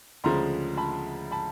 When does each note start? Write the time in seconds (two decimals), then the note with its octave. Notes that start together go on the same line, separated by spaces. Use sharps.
0.24 D2 C#3 F3 G#3 A#5 C6
0.78 A5 B5
1.31 A5 B5